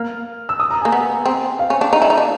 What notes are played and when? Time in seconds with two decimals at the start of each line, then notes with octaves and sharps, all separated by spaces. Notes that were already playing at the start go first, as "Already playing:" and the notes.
Already playing: A#3 F6
0.49 E6
0.60 D#6
0.71 A#5
0.81 A#3 G#5
0.92 B3
1.25 C4
1.59 F5
1.70 C#4
1.81 D4
1.93 D#4
2.02 E4
2.10 D#4
2.17 D4